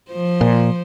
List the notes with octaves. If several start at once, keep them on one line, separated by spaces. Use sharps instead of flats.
F3 C5
A#2